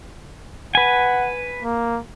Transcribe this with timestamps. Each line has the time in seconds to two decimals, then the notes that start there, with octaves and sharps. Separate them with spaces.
0.75 B4 F#5 G#5
1.63 A#3